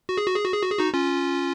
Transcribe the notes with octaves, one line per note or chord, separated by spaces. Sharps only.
F#4
G#4
F#4
G#4
F#4
G#4
F#4
G#4
D#4 F#4
C#4 F4